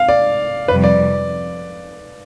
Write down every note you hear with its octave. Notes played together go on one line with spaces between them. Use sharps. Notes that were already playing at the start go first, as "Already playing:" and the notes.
Already playing: F5
D5
F2 C3 G3 B4
D5